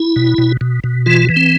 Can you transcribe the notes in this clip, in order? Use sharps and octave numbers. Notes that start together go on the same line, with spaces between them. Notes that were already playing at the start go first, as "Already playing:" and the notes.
Already playing: E4
B2
B2
B2
B2
E3 F4
E3
C4